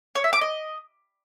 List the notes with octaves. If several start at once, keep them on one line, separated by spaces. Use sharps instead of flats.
C#5
E5
D6
D#5